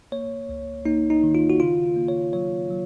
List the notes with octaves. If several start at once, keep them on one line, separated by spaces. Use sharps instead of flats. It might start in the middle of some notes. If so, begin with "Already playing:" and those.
A#3 C#5
C#2
A#3 D#4
D#4
D#3
F4
F#4
C#3 F4
A#3
C#5
F#3 C#5
F#3